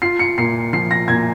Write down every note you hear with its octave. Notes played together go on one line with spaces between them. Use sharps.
F4 C7
C#7
A#2 C7
F3 C7
A#6
A#2 G#6